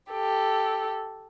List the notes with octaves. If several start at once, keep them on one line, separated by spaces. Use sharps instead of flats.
G4 A4